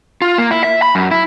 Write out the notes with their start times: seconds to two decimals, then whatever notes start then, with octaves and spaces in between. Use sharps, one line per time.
0.22 F4
0.38 A#3
0.51 E4
0.64 E5
0.82 B5
0.95 F#2
1.11 E4